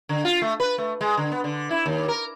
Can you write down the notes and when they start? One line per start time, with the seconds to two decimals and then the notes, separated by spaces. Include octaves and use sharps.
0.09 D3
0.25 F4
0.42 A3
0.60 B4
0.78 A3
1.01 G#3
1.17 D3
1.32 B3
1.44 D3
1.71 E4
1.86 D#2
2.08 A#4